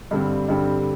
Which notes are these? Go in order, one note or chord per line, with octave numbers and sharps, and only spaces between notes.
G2 D3 G3 C4
G2 D3 G3 C4